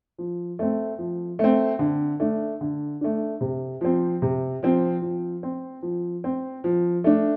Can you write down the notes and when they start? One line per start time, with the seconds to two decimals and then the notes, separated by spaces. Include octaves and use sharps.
0.18 F3
0.59 A3 C4
0.98 F3
1.39 A3 C4
1.79 D3
2.20 A3 D4
2.61 D3
3.01 A3 D4
3.41 C3
3.81 F3 C4
4.22 C3
4.63 F3 C4
5.02 F3
5.43 C4
5.83 F3
6.24 C4
6.64 F3
7.04 A3 D4